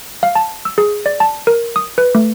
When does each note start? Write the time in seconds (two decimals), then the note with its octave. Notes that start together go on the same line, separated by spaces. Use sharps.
0.23 F5
0.35 A5
0.65 E6
0.78 G#4
1.06 D5
1.20 A5
1.47 A#4
1.76 D#6
1.98 B4
2.15 A3